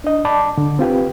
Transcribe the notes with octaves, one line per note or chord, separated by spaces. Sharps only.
D4 D#5
D5 A5 B5 D6
D3
C4 F4 G4 B4